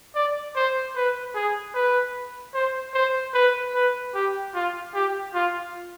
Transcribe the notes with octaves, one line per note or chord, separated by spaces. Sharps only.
D5
C5
B4
G#4
B4
C5
C5
B4
B4
G4
F4
G4
F4